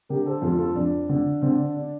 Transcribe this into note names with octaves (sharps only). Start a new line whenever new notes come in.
D3 G4 A#4
A4 C5
F2 F4 A4
F4 A4
F2 D4
D3
D3 C4
D4
D4